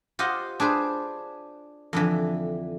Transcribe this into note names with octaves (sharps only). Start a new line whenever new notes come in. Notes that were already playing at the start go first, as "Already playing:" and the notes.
F4 G4 C5 D#5 F#5
D4 G#4 B4 C5
F2 D3 E3